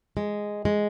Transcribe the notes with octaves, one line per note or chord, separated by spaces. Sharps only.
G#3
G#3